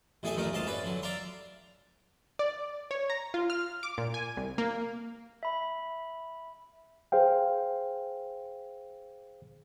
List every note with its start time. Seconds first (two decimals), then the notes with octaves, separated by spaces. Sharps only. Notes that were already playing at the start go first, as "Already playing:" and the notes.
0.23 A1 A2 G#4 A4 E5 G#5
0.36 A1 D#2 A#2 A3 A#4
0.53 D2 G#2 D#5 F5 A5
0.66 C#4 B4 D5
0.84 D3 F#3
1.03 D5 E5 F5 A#5 C6
2.39 D5
2.91 C#5
3.10 A#5
3.34 F4
3.50 F6
3.83 D6
3.98 A#2
4.14 G#5
4.37 C2
4.58 A#3
5.43 E5 B5
7.12 G#4 C5 F5 G5